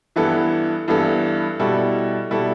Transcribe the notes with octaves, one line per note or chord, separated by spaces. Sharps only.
G2 E3 B3 E4 A4
G2 E3 B3 E4 A4
B2 G3 E4 A4
B2 G3 E4 A4